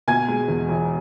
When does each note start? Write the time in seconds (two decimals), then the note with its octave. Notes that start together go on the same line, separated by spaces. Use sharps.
0.08 B2 G#5 G#6
0.28 G#3
0.48 E2
0.69 E1